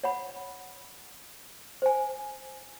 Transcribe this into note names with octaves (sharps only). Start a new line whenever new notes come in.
C#5 F#5 B5
C5 G#5